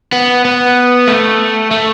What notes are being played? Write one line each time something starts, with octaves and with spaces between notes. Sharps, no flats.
B3
B3
A3
A3